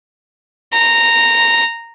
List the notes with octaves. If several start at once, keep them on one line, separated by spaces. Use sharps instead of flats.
A#5